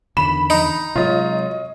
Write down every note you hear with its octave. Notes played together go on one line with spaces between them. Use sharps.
E2 D3 D#3 B5 E7
D#4
C3 F#3 G#3 F4 C#5 D#5